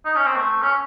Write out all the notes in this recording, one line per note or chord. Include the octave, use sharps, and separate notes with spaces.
D#4
C#4
C4
A3
C#4